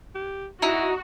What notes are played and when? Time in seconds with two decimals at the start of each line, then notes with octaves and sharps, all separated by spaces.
0.15 G4
0.62 D#4 E4 F#4